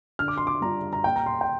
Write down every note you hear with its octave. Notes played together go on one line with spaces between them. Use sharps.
D3 F6
D6
C6
D6
G3 D4 F4 A#5
A#5
A#2 G5
A#5
C6
G5